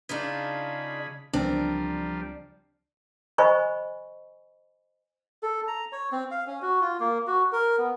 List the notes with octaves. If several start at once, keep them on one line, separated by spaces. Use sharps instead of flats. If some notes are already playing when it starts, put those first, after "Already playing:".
C#3 D4 D#4 F4 G#4 B5
C#2 C#3 E3 F3 G3 C4 D4 A#4
C5 D#5 G#5 B5 C#6
A4
A#5
C#5
C4
F5
C#4
F#4
F4
A#3
F#4
A#4
B3